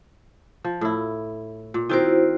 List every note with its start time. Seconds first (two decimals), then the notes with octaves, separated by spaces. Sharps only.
0.64 F3
0.81 A2 E4
1.74 A#2
1.90 D#3 C4 E4 F#4 A#4 C5